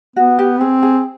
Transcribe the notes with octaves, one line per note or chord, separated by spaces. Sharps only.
B3 F#4
G4
C4 G#4
G#4